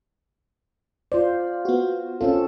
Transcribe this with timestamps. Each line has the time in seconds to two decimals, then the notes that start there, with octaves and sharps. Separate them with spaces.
1.12 F4 C5 D5
1.65 B3 F#4
2.21 C4 C#4 F4 A4